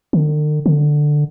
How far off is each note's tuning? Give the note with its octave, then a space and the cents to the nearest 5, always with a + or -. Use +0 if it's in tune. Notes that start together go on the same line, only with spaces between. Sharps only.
D3 +45
D3 +10